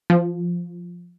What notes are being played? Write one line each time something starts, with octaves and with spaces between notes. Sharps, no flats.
F3